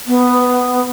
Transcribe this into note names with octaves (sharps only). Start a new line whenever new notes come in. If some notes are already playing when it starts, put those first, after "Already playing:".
B3